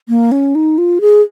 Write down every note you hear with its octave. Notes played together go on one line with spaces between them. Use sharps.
A#3
C#4
D#4
F4
G#4